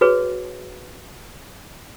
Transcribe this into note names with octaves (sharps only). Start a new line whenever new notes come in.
F#4 G#4 B4 C#5